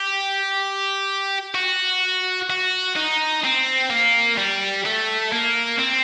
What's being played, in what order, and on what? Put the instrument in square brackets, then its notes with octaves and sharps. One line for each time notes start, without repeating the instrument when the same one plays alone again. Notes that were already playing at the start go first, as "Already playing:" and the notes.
Already playing: [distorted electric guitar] G4
F#4
F#4
D#4
C4
A#3
G3
A3
A#3
C4